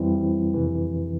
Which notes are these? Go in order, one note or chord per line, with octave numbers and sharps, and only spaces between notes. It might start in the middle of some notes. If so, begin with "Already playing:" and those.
Already playing: F2 E3 G3 C4 E4
F2 C3 E3